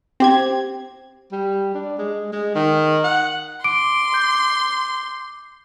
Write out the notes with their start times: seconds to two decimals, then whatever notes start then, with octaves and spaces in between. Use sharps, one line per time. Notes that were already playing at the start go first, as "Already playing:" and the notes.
0.20 C4 G4 G#6
1.32 G3
1.74 D4
1.99 G#3
2.33 G#3
2.55 D#3
3.04 F#5
3.64 C6 D6 D7
4.13 D6 G6